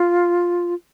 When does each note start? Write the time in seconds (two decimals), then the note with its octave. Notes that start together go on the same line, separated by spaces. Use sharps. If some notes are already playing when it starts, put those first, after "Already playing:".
Already playing: F4